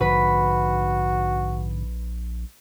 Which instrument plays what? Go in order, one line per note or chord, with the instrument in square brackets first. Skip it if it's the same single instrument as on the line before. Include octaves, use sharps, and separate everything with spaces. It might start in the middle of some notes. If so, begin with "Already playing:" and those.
[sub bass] A#1 [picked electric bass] G#2 D3 F3 [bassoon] F#4 [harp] B4 B5